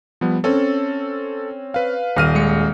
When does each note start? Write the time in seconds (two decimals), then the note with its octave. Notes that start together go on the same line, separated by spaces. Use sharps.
0.21 F3 G3 B3
0.44 C4 C#4 A4
1.74 B4 F5
2.16 D#1 F6 D#7
2.35 G#3 C#7